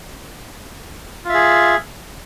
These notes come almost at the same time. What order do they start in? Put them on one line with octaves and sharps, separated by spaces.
F4 E5 G#4